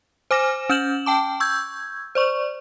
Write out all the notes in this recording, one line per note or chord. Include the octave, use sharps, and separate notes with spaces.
C5 G#5 D6 F6 A#6 E7
C#4 F6 G6 E7 F#7
G5 A5 D6
C#6 E6 G6 G#6
C5 D5 C#6